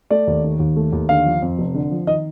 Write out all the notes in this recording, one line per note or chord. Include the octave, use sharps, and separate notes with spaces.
A3 D5
D#2
D#3
D#2
A3
D#2
D3 F5
F3
F2
F1
D3
F3
D#3 D#5